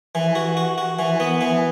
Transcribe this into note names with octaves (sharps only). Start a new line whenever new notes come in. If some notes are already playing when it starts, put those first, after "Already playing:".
E3
F#4
F#4
F#4
E3
B3
E3